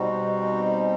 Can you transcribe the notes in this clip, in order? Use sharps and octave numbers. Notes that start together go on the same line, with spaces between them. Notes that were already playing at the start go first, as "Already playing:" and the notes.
Already playing: B2 G3 C4 D#4 F#4